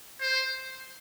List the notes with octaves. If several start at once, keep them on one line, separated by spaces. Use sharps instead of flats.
C5